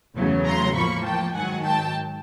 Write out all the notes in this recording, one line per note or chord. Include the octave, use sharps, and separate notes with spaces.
E2 C#3 F#3 A3
A#5 C6
A2 F3 A#3 B5 C#6
G5 A5
G#2 D#3 F#3 F#5 G#5
G5 A5